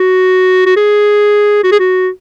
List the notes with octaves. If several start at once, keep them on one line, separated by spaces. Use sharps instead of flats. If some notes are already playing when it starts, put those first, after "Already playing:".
Already playing: F#4
F#4
G#4
F#4
G#4
F#4